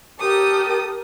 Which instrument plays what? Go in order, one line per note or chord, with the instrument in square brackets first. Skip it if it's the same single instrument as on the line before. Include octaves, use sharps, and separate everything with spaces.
[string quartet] G4 A4 D#6 [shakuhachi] A#4